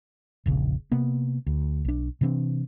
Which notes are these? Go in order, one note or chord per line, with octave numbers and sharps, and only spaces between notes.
E1 A#1 C#3
C3 A#3 B3
D2
B1 D4
C3 E3 C4 D4